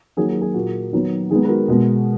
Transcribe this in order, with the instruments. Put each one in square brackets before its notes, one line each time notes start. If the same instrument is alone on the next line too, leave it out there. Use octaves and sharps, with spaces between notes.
[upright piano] D#3 F#3 A#3 G#4
F#4
G#4
A#2 A#3 F#4
D#3 F#3 B3
D#3 G#3 B3 G#4
B4
F#4 A#4
B2 G#3 B3